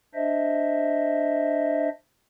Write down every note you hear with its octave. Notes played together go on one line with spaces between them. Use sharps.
D4 C5 D#5 E5